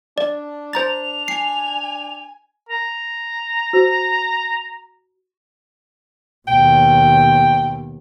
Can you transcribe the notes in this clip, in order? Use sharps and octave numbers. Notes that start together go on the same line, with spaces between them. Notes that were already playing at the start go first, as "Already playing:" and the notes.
D4 D5
C5 A#5 A6 F7
G#5 C7
A#5
F#4 C5
D#2 B2 G5